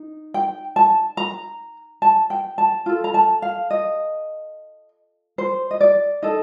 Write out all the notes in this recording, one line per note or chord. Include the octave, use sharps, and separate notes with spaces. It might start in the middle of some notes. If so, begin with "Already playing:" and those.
Already playing: D#4
G5
A5
A#5
A5
G5
A5
F4 A4
A#5
A5
F5
D#5
C5
D#5
D5
D#4 A4 D#5